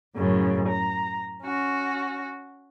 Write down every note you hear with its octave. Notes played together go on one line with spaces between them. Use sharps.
F#2 A2 C#3
A#5
C#4 F#4